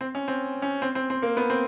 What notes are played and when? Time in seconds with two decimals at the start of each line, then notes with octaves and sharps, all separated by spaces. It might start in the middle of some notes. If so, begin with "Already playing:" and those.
0.01 C4
0.15 C#4
0.28 C4
0.62 C#4
0.82 C4
0.95 C4
1.10 C4
1.23 A#3
1.37 B3
1.50 C4